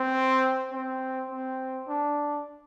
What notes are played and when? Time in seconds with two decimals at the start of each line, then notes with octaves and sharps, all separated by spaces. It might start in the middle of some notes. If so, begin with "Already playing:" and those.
Already playing: C4
0.72 C4
1.30 C4
1.88 D4